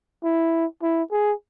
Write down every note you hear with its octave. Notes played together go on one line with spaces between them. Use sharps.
E4
E4
G#4